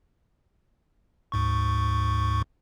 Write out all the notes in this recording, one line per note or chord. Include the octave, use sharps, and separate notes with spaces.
D2 G#2 C#6